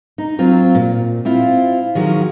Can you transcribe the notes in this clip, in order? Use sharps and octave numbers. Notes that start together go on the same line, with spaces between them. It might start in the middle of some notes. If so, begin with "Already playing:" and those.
D#4
F#3 C4 F4
A#2
C4 E4 F4
D#3 F3 F#3 F4 F#4 G#4